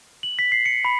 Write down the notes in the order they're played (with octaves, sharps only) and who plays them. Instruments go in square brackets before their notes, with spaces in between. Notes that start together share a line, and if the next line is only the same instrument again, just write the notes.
[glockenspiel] F#7
B6
C7
C#7
B5